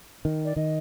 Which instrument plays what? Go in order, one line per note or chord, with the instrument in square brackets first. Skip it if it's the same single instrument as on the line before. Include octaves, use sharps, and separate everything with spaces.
[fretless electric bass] D#3
[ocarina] D5
[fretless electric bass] D#3 [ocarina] D#5